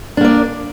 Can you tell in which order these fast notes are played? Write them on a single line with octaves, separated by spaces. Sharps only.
D4 A#3 D5